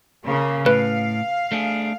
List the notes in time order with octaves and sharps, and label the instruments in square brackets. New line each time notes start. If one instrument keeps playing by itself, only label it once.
[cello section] C#3 A#3
[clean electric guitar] A2 [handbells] B4 [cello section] F5
[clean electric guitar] A3 D4 G#4